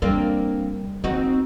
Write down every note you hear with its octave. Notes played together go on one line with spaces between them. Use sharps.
G3 A#3 C4 D4
A#3 C4 D#4 F#4